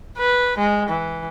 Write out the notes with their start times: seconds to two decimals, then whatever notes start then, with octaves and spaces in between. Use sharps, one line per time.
0.18 B4
0.58 G#3
0.89 E3